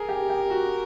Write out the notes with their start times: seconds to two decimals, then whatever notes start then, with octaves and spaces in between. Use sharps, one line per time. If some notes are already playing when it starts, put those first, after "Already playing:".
Already playing: G#4 A#4
0.09 G4
0.30 G4
0.50 F#4